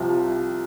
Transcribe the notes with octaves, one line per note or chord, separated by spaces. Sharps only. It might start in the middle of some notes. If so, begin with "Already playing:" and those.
Already playing: C2 C3 F3